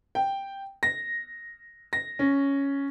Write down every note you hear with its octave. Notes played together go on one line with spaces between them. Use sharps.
G5
A#6
A#6
C#4